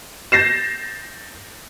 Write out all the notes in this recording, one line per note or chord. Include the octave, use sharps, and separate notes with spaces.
G6 A6 A#6 C7 E7